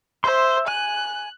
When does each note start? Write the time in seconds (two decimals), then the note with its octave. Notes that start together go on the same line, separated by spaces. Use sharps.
0.24 C5 E5 C6
0.68 G#5 F#6